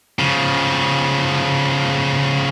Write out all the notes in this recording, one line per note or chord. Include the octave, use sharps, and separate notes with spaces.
C#3 F3